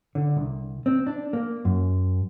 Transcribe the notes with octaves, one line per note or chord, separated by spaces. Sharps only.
D3
C2
C4
D4
A#3
F#2